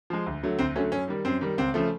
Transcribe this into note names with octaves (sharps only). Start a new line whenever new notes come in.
F3 G#3
D2
D3 F#3 A3
D2 C4
D3 F#3 A3 C#4
F#2 C#4
D#3 G3
F#2 C4
D#3 G3
C#2 C4
C#3 F3 A3